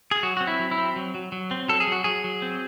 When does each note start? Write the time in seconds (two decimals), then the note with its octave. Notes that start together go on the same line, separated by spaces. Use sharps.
0.11 G#4
0.23 F#3 F#4
0.37 C4 F#4
0.47 E4
0.59 F#3
0.71 E4
0.78 C4
0.96 F#3
1.15 F#3
1.32 F#3
1.51 C4
1.69 F#3 A4
1.80 G#4
1.87 F#3 F#4
2.04 F#3 G#4
2.24 F#3
2.42 C4